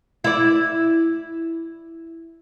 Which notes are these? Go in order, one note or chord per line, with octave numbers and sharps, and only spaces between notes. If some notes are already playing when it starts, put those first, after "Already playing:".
E4 D5